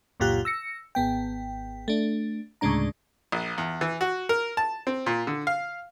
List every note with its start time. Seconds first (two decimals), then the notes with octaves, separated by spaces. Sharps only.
0.20 C#2 F#2 A#2 F4 G4 F#6
0.45 E6 A#6 C#7
0.95 G#1 B3 G5
1.88 A3 D4
2.61 D2 A2 C#3 G#3 D4 A#5
3.32 A#1
3.58 E2
3.81 E3
4.01 F#4
4.29 A#4
4.57 A5
4.87 C4
5.06 A#2
5.27 D3
5.47 F5